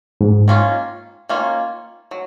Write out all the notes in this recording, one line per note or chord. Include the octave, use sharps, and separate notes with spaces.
G#2
D#3 A#3 C#4 F4
D#3 A#3 C#4 F4
F#3